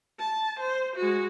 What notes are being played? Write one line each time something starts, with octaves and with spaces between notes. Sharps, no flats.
A5
C5
G#3 F#4